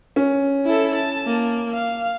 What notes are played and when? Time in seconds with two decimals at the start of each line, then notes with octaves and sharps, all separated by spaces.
0.16 C#4
0.65 E4 A4
0.96 A5
1.26 A#3
1.73 F5